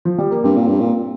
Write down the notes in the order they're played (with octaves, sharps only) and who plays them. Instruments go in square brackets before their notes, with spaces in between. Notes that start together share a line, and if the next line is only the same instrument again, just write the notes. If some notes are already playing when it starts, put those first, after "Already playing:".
[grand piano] F3
G3
A#3
[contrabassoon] G2 [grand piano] C4
[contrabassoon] A#2
G2
A#2